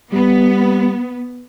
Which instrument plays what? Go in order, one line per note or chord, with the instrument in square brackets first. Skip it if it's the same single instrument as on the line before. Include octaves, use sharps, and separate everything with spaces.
[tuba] G3 [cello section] B3